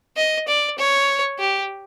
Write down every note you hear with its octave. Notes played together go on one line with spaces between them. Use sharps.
D#5
D5
C#5
G4